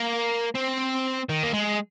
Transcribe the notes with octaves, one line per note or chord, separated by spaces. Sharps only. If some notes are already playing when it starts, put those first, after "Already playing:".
Already playing: A#3
C4
D#3
A#3
G#3